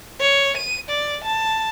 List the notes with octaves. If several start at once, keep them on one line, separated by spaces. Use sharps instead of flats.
C#5
D#7
D5
A5